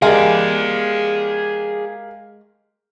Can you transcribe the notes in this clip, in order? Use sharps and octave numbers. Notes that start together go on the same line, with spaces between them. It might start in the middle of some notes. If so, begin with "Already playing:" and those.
G#3 G4 G#4 A#4 D5 F5